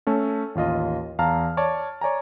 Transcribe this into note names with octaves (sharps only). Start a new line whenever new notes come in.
A3 C#4 A4
A1 D#2 F4 D#5
E2 F5 A5 A#5 F6
C#5 D5 A5
C#5 D5 G#5 A#5